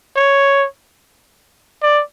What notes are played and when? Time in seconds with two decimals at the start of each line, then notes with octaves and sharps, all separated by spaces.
0.16 C#5
1.82 D5